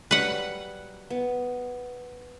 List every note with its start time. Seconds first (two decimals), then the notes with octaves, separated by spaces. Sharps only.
0.11 F#3 G3 B4 F#5
1.10 B3